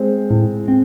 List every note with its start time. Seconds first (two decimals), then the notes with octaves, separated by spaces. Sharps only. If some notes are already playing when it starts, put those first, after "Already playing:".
Already playing: G#3 C4
0.30 A2
0.68 C4